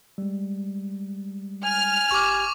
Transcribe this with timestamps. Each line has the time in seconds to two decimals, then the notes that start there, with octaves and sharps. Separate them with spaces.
0.18 G3 G#3
1.64 G#5 F6
2.11 G1 G4 C#6 D6